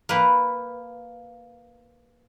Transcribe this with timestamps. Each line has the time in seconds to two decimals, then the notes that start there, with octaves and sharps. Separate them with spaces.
0.09 A#3 B4